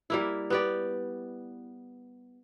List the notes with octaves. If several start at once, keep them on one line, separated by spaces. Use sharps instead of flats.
G3 A#3 E4
B3 G4 D5